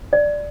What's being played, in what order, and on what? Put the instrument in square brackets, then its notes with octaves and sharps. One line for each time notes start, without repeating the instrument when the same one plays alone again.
[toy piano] D5